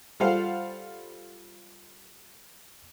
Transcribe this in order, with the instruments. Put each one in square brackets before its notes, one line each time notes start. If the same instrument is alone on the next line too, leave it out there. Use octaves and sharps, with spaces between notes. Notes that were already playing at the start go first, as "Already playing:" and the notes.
[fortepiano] G3 F4 A4 C5 F5 F#5